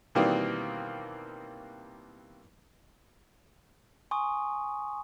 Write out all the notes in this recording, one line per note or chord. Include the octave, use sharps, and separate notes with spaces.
B2 D#3 E3 G3 A#3 C4
G#5 C6 C#6 D#6